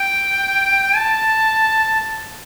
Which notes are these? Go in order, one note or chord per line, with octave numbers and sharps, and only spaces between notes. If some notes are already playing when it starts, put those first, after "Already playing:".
Already playing: G5
A5